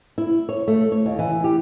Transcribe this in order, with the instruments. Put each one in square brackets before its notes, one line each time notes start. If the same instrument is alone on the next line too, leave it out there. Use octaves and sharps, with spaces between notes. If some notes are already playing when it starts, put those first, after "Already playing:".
[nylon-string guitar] E4
C#5
A3
C#5
D#2
E3
G4